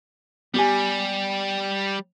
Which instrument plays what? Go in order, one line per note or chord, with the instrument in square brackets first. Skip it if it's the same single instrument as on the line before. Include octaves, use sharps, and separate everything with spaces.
[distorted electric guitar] G3 [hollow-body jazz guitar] B3 G4 G#5